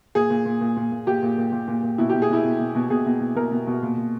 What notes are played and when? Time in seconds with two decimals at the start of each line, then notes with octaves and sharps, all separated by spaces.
0.15 A#2 G#4
0.30 A#2
0.45 A#2
0.61 A#2
0.76 A#2
0.92 A#2
1.07 A#2 G4
1.23 A#2
1.38 A#2
1.52 A#2
1.68 A#2
1.83 A#2
1.98 B2 E4
2.09 B2 G4
2.22 G#4
2.29 B2 E4
2.44 B2
2.59 B2
2.75 B2
2.90 B2 G#4
3.06 B2
3.20 B2
3.35 B2 A#4
3.52 B2
3.67 B2
3.82 A#2
3.97 A#2